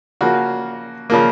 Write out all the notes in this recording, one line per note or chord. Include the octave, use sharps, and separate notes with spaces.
C#3 F3 A#3 F#4
C#3 F3 A#3